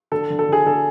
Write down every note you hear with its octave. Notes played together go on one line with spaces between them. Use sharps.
D3 A4
D3
A4
D3 G#4
D3 A4